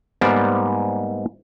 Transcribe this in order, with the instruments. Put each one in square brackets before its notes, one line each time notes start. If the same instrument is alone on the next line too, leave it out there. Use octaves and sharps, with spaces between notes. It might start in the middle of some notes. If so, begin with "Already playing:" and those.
[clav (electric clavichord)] G#2 G3 A#3 B3 C5 D5